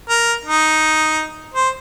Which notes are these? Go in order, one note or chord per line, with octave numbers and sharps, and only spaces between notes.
A#4
D#4
C5